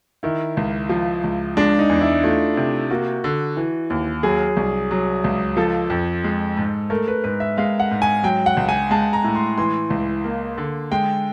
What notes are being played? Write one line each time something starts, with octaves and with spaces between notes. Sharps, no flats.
D#3 E4
C#2
F3
C#2
G#3 D4
D#4
E2
E4
A3 F4
C3
A#3 F#4
D3
E3
D#2
F#3 G#4
C2
F#3
C#2
F3 A4
F2
G#3
G#2
A3 A#4
B4
G#2 B4
E5
G#3 F5
F#5
G#2
G#5
F#3 G5
F#5
C#2
G#5
G#3 A5
A#5
A2
C6
E3 C6
C#2
A#3
D3
G#3 G5